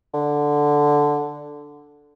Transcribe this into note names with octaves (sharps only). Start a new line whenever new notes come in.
D3